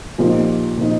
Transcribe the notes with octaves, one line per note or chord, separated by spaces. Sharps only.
A#2 F3 A#3 D#4 G4
A#2 F3 A#3 D#4 G4